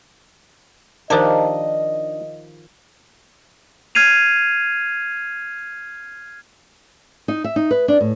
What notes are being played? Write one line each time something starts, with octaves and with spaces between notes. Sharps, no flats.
D#3 F3 D4 D#4 G4 A#4 C5 D#5
F6 G#6 C7 D#7 F7
D#4
E5
D#4
B4
D4
A2